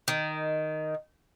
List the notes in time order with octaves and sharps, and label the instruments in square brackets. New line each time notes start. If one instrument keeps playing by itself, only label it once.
[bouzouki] D#3